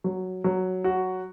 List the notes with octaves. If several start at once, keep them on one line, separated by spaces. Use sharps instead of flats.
F#3
F#3
F#4